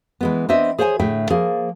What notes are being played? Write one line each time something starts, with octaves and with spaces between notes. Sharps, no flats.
E3 G#3 B3
B3 C4 D4 D#5 E5
G#4 C5 C#5 F#5 G#5
A2 D3 G#4 E5 G5
F3 A#3 G#4